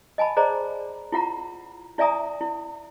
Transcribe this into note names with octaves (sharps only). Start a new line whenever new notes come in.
D#5 G#5 A5 B5
G#4 C5 D5 D#5 A#5
E4 F4 F#5 A#5
E4 D5 E5 G#5 A#5 D#6
E4